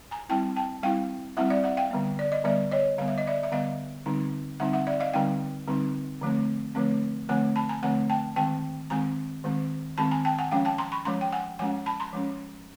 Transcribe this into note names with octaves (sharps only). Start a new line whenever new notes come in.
G#5 A#5
G3 C4 E4 G5 A5
G5 A5
G3 C4 E4 F5 G5
G3 C4 E4 E5 F#5
D5 E5
E5 F#5
F5 G5
D3 G3 B3
D5
D#5
D3 G3 B3 D5 E5
C#5 D#5
D3 G3 B3 F5
E5
D#5
D5 E5
E5
D3 G3 B3 D#5 F5
D3 G3 C4 D#4
D3 G3 C4 D#4 E5 F#5
E5 F#5
D5 E5
D#5 F5
D3 G3 C4 D#4 F5 G5
D3 G3 C4 D#4
D3 F3 A3 C4
D3 F3 A3 C4
D3 F3 A3 C4 F#5 G#5
A5 B5
G#5 A#5
D3 F3 A3 C4 F#5 G#5
G5 A5
D#3 G#3 C4 G5 A5
D#3 G#3 C4 G#5 A#5
D#3 G#3 C4
D#3 G#3 C4 A5 B5
G#5 A#5
G5 A5
F#5 G#5
F3 G#3 C#4 F5 G5
G5 A5
A#5 C6
B5 C#6
F3 G#3 C#4 A#5 C6
G5
F#5 G#5
F3 G#3 C#4 F#5 G#5
A5 B5
A#5 C6
F3 G#3 C#4